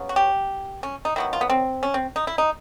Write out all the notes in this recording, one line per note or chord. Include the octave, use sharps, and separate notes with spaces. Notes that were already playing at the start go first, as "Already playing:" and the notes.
Already playing: C#3 F#3 B3
F#4
G4
C#4
D#4
D#3 F#3 B3 E4
F4
B3
C4
C#4
C4
D#4
E4
D#4